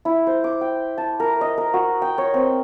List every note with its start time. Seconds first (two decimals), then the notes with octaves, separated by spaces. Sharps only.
0.05 E4
0.27 C5
0.44 D6
0.61 G5
0.98 A5
1.20 A#4
1.41 D#5
1.58 A#4
1.74 F#4
2.02 G5
2.18 C#5
2.34 C4